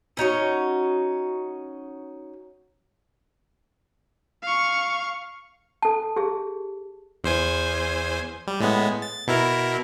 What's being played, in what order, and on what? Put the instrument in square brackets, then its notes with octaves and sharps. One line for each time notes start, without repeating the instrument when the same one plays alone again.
[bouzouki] C#4 D#4 F#4 C#5
[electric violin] F5 C#6
[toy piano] A4 A5
G4 G#4
[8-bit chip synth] E2 C5 G#5
G3
A2 G#3 B3
A6
B2 E4 A#4